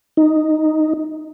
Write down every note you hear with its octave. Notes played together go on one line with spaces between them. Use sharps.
D#4